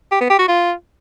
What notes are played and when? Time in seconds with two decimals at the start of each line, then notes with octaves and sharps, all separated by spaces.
0.12 G4
0.21 B3
0.30 G4
0.39 F#4
0.48 F4